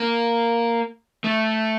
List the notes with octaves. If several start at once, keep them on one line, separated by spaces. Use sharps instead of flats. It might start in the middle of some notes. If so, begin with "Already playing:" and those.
Already playing: A#3
A3